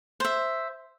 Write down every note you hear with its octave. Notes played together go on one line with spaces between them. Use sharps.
C5 E5